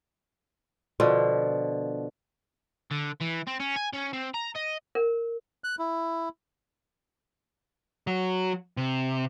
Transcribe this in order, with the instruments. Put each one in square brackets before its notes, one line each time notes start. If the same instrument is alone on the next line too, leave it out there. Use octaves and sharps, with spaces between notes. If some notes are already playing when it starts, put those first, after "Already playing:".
[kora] B2 D3 F3
[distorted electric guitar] D3
E3
C4
C#4
G#5
C#4
C4
A#5
D#5
[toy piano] A#4
[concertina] F#6
E4
[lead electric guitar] F#3
C3